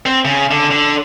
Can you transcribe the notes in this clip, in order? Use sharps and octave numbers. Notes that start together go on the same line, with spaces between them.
C4
C#3
D3
D3